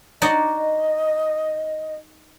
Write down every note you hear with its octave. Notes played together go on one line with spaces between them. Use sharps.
D#4 F#4 D5 D#5